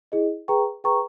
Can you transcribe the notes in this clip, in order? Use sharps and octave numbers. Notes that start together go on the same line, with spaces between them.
E4 G#4 D#5
G#4 B4 G5 A#5 C#6
G#4 B4 G5 A#5 C#6